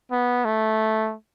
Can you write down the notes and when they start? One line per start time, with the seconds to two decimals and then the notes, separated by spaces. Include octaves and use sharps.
0.12 B3
0.45 A3